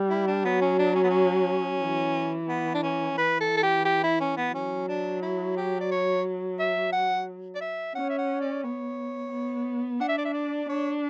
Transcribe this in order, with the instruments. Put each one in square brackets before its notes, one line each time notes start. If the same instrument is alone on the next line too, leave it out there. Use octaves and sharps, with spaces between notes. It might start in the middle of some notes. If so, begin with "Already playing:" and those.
Already playing: [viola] G3
[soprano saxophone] E4
D4
[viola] F#3 [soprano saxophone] B3
[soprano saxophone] C#4
D4
C#4
B3
C#4
[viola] E3
[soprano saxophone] B3
D4
C#4
[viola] E3 [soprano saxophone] B4
[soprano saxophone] A4
A4
G4
G4
E4
C#4
B3
[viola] F#3 [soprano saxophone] C#4
[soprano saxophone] D4
E4
G4
D5
C#5
E5
F#5
D5
E5
[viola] C#4 [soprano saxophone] F#5
[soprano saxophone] E5
F#5
D5
[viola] B3 [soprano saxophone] C#5
[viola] B3
[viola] D4 [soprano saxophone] F#5
[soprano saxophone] E5
D5
E5
D5
[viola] D4 [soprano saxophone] C#5